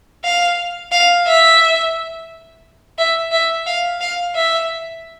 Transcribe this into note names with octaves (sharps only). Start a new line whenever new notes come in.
F5
F5
E5
E5
E5
F5
F5
E5